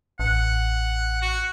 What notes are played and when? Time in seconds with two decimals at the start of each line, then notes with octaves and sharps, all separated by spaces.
0.20 A1 F#5
1.22 F#4